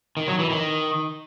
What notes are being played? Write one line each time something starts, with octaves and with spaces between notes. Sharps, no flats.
D#3
F#3
E3
D#3